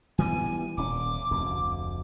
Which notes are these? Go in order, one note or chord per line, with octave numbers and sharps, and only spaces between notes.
E3 G3 B3 G#5
D#1 C#4 D6
F1 D2